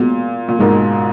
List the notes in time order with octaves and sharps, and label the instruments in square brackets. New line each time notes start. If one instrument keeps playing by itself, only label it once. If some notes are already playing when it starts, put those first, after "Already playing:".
Already playing: [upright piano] A#2 [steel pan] G#3 B3 F#4
[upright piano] A#2
[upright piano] G#2 B2 [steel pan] G#3 D#4 A#4